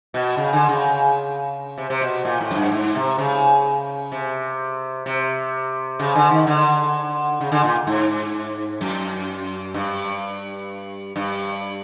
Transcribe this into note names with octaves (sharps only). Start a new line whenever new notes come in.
B2
C#3
D3
C#3
C3
C3
B2
A#2
A2
F#2
G2
G#2
C3
C#3
C3
C3
C#3
D3
D#3
D3
C#3
D3
A#2
G#2
F#2
G2
G2